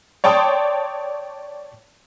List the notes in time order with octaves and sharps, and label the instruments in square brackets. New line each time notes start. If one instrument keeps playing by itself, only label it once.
[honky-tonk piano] C#5 D5 G5 A5 C6 D#6